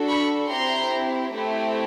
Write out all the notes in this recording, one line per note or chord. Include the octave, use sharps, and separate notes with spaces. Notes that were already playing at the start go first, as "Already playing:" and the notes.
Already playing: D4 F#4 A4
B5 C#6
C4 E4 G4 A#5 C6
A3 C4 E4 G4